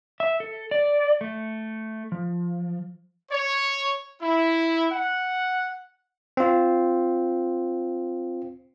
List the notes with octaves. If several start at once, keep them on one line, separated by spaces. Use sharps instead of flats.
E5
A4
D5
A3
F3
C#5
E4
F#5
C4 F4